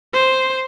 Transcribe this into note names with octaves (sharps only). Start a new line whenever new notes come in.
C5